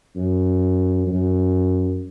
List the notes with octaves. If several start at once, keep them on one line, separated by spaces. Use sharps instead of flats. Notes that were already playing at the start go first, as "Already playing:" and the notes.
F#2
F#2